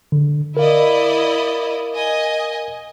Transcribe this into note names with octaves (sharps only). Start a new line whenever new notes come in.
D3
E4 A#4 D5 D#5 F5
D#5 G#5